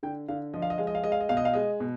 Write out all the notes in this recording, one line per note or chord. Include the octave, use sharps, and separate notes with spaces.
D3 G5
D3 F5
F3 D#5
F5
D#5
G#3 F5
D#5
F5
G#3 D#5
F5
D#5
B2 F5
D#5
F5
G#3 D#5
B2